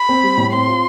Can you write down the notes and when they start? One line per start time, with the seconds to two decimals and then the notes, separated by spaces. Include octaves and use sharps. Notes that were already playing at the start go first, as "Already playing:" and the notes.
Already playing: B5
0.09 C4
0.23 G3
0.37 A2
0.52 C4 C6
0.68 F4